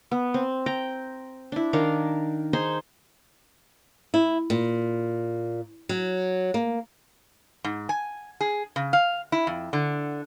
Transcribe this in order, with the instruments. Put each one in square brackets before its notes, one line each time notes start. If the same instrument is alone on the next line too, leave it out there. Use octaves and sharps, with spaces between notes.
[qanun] B3
C4
G5 A#5
D4 E4
D#3 D4 A#4 F5
D#4 G#4 C5 C6
[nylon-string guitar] E4
A#2
F#3
A#3
[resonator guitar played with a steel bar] G#2
G#5
G#4
C#3
F5
E4
F2
D3